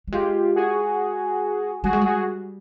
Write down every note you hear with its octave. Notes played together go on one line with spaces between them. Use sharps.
G3
G#3 F4 G4
F#4 G#4
G3 F#4 G#4
G#3
G3 F#4 G#4